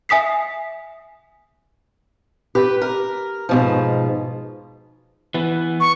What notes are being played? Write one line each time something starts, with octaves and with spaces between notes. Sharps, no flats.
E5 G#5 D#6 B6 C7
G4 B4
A#4
G#2 B2 F3
E3 B3
C#6